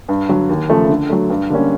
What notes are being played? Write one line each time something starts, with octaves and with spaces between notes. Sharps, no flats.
G2
D3 F#3
D#2
C#3 F3 A3
D3
F#3 A3
G2
D3 G3 A#3 C#4